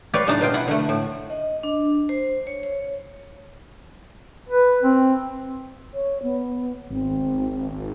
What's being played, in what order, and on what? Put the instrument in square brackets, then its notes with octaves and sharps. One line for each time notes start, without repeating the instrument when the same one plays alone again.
[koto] G4 B4 C#5 D5 F5
A2 C#3 D4 D#4 A5 A#5
B2 F4 G5
E4 F#5
D3 A3
A2
[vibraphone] D#5
D4
C5
C#5
C#5
[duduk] B4
C4
[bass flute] C#5
B3
[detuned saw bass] G#1 [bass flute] C4